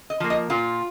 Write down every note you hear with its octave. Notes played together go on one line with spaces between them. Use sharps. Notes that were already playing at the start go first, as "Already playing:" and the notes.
D#5
F3 A#3
D#5
A#2 F4